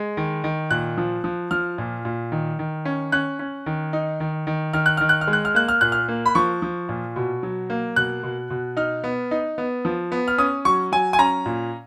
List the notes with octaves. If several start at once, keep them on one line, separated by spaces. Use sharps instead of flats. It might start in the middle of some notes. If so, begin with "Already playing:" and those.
Already playing: G#3
D#3
D#3
A#2 F#6
F3
F3
F3 F6
A#2
A#2
D#3
D#3
C#4
C#4 F#6
C#4
D#3
D#4
D#3
D#3
D#3 F6
F#6
D#3 F6
F#6
F6
G#3
F#6
F6
A#3 F#6
F6
A#2 F#6
F6
A#3
B5
F3 C#6
F3
A#2
B2
F#3
A#3
B2 F#6
B2
B2
D#4 F6
B3
D#4
B3
F3
B3
F6
C#4 D#6
F#3 C#6
F#3 G#5
G#5
C#4 A#5
A#2